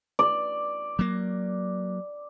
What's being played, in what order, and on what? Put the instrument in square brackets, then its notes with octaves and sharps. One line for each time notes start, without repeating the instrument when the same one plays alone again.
[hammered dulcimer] D5
[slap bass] F#3 A#3